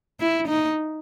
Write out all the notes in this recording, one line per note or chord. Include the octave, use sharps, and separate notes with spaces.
E4
D#4